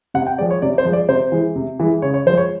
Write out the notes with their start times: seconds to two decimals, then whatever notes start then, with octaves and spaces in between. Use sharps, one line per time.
0.14 C3 F#5
0.27 G5
0.38 F3 G#3 D5
0.50 C#5
0.62 C3 D5
0.78 C5
0.85 F3 G#3
0.93 D5
1.08 C3 C5
1.32 E3 G#3
1.56 C3
1.80 E3 G#3
2.02 C#3 C#5
2.14 C#5
2.26 F3 G#3 C5
2.38 C#5